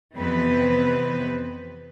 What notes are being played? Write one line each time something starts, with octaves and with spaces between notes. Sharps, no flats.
F2 C3 E3 B3 C4 B4